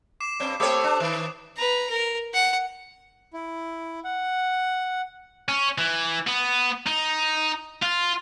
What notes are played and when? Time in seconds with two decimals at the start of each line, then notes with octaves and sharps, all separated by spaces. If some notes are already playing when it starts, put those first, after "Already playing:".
0.20 D6 C7 E7
0.40 G2 C4
0.60 A3 C4 G4 A4 C5 C#5 D#6
0.84 D4 D6
1.00 D#3 F#6
1.57 B4 A#5
1.90 A#4
2.34 F#5
3.33 E4
4.04 F#5
5.49 C#4
5.78 E3
6.27 B3
6.87 D#4
7.82 F4